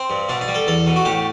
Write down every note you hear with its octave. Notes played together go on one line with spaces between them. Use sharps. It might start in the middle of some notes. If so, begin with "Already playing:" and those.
Already playing: C4
G2
B2 D4
D4
G3
A4
E2 A4
B2
F#4
A2 G4